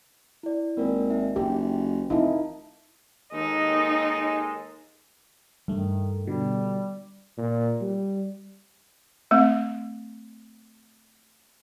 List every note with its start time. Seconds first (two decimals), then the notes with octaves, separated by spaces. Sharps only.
0.43 E4 D5
0.77 G#1 A#3 A#4 D5
1.10 D#4 E5
1.36 F#1 G4
2.10 F1 D#4 E4 F5 A5
3.33 D#2 G#3 D#4 A4
5.68 G2 D#3 A3
6.27 B2 D3 G3
7.38 A#2
7.81 G3
9.31 A3 C4